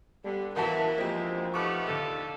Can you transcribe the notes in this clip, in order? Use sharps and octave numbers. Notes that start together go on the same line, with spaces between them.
D3 G3 B3
C#2 E3 B3 E4 F#4 A#4 C5 A5
D2 F3 G#3 A#3 C4 G4
A3 B3 D#4 G4 C#6 D6 F6
D#2 D3 A4